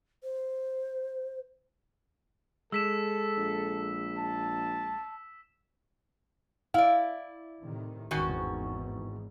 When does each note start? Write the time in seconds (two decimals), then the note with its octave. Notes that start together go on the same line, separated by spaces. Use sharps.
0.23 C5
2.72 G#3 A4 E6 B6 E7
3.37 A#1
4.18 A5
6.74 E4 D5 F5
7.61 A2 C3 D#3
8.11 G#1 E2 G#2 D#3 C#4 F#4